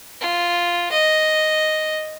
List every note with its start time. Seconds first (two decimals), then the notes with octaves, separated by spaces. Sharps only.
0.21 F4
0.92 D#5